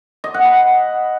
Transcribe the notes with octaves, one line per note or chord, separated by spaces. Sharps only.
D#5
F#5
B5